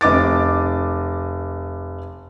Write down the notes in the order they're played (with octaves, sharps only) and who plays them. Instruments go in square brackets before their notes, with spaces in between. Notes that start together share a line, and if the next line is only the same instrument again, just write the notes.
[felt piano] F1 D#5 D6 A6